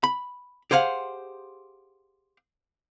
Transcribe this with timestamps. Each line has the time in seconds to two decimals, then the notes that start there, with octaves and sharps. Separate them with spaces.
0.04 B5
0.71 G4 G#4 C5 F5 F#5